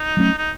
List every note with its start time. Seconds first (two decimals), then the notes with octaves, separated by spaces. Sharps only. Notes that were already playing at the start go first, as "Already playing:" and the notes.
Already playing: D#4
0.17 F#3 A3 C#4
0.38 D#4